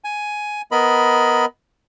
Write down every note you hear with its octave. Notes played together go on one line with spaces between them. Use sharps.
G#5
B3 A#4 D#5 B5